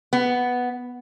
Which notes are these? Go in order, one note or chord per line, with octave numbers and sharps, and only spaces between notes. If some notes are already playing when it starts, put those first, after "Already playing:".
B3